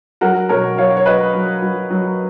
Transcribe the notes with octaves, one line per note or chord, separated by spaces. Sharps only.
F#3 F#4 A#4
B2 A#4 C#5
F#3 C#5 F5
C#5
F#3 B4 D#5
F#3
F#3
F#3